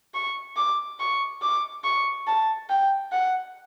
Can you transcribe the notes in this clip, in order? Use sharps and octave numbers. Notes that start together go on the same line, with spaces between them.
C#6
D6
C#6
D6
C#6
A5
G5
F#5